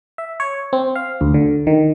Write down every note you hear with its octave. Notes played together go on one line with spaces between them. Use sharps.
E5
C#5
C4
F5
D2
D3
D#3